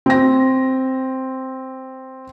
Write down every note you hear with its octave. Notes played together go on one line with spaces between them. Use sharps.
C4 A#6